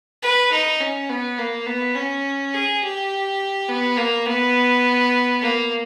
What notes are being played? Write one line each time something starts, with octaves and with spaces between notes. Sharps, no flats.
B4
D#4
C#4
B3
A#3
B3
C#4
G#4
G4
B3
A#3
B3
A#3